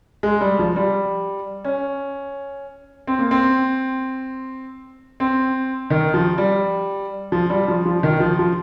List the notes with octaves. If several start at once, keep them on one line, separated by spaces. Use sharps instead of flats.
G#3
G3
F3
G3
C#4
C4
A#3
C4
C4
D#3
F3
G3
F3
G3
F3
F3
D#3
F3
F3